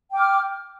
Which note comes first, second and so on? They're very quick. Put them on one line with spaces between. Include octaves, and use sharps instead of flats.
G5 D6 F6